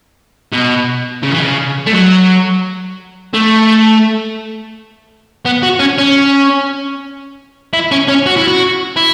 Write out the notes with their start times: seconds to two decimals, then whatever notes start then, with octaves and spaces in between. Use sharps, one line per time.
0.52 B2
1.23 C#3
1.31 E3
1.40 C#3
1.86 A3
1.93 F#3
3.34 A3
5.45 B3
5.63 F#4
5.79 C#4
5.98 C#4
7.73 E4
7.91 C#4
8.08 C#4
8.26 F#4
8.37 E4
8.48 F#4
8.96 E4